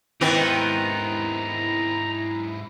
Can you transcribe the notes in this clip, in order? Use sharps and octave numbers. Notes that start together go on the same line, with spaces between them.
G#2 D#3 B3 C4 E4 G4 A#5